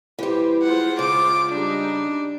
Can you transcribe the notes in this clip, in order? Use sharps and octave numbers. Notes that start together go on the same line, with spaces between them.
E3 G3 G4 C5
G#3 F4 C5 F#5
C#3 D6
G3 D4 D#4